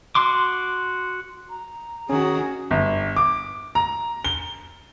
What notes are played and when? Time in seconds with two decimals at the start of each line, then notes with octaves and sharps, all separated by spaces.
0.15 F#4 C6 D6
1.50 A#5
2.09 D#3 C#4 F#4 G#4
2.71 G1
3.16 D6
3.75 A#5
4.25 G7